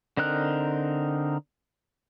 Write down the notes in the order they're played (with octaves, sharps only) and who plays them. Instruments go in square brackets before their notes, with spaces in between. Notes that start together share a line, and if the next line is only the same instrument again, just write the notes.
[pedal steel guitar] D3 C4 D#4 A#4 F#6